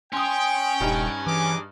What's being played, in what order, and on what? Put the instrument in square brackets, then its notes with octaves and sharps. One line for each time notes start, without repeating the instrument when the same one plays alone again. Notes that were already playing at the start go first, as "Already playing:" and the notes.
[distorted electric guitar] C#4 [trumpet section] G5 [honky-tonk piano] C6 D#6
[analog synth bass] D#1 [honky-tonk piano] G2 G3 D#4
[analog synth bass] E3 [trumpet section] G#4 D#5 D6